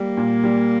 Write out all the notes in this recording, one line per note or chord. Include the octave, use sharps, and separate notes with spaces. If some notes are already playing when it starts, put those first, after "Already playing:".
Already playing: G3 A#3
A#2
G3